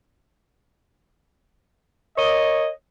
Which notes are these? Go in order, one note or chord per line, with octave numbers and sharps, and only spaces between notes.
A#4 C#5 D#5